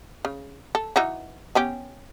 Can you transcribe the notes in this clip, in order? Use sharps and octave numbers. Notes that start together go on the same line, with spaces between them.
C#3
A4
E3 D#4 F#4
B3 C#4 G4